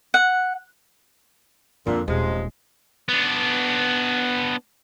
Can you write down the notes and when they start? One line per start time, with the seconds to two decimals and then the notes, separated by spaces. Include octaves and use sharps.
0.14 F#5
1.87 F2 A#2 D3
2.08 D#1 C3 F3 G#3
3.08 B3 D4